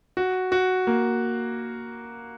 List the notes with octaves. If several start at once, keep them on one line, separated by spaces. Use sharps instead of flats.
F#4
F#4
A#3